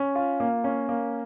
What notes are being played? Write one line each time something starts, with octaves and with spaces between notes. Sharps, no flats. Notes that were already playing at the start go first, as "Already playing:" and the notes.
Already playing: C#4
F4
A#3
C#4
A#3